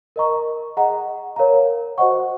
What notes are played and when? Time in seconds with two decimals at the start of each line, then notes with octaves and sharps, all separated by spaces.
0.16 A#4 D#5 A#5 C#6
0.77 G#4 D#5 F#5 A#5
1.36 A#4 C#5 F5 A#5
1.98 F#4 C5 D#5 F#5 C#6